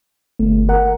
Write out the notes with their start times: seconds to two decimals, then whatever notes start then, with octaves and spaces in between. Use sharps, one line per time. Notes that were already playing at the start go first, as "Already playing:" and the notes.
0.39 G1 A3
0.69 A#4 F#5